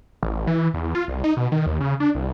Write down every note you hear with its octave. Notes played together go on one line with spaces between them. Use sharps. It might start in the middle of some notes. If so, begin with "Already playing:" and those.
A1
E3
E2
F4
C2
D#4
B2
D#3
D#2
C#3
D4
C2